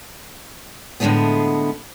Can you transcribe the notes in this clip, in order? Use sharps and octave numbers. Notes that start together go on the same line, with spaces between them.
A2 D3 D#3 G#3 A3 B3